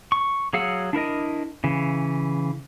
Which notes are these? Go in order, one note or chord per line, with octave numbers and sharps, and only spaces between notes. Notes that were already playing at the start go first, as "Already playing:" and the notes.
C#6
F#3 G#4 F5 F#5 E6
D4 E4 A#4 D#5
C#3 E3